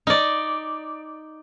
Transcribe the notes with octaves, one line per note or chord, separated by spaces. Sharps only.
D#4 D5